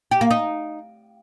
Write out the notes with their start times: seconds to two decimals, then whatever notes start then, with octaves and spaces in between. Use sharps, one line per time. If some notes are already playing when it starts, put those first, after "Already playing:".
0.11 G4
0.21 A#3
0.31 D#4